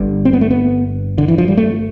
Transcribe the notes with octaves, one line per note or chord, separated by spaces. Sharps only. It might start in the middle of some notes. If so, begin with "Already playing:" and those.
Already playing: G1 G2 D3
C4
B3
A3
B3
D3
E3
F3
G3
A3